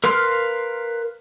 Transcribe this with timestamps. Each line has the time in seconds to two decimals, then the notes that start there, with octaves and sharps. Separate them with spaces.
0.04 A#4 B4 F5 C6 F6